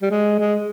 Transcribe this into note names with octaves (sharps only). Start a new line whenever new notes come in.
G3
G#3
G#3